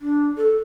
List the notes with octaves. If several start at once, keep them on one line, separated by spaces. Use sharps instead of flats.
D4
A4